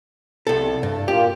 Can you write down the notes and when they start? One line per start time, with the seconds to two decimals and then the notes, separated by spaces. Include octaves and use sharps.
0.47 C2 A4
0.83 G2
1.08 A#2 A#3 F4 G4